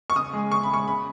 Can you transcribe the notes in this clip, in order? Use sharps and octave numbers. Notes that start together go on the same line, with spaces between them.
C#6
C#3 D#6
G#3
C#3 C#6
B5
G#3 C#6
C#3 B5